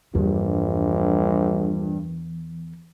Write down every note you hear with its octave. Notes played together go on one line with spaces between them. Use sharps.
A#1 E2 G2